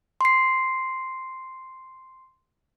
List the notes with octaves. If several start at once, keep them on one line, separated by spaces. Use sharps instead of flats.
C6 C7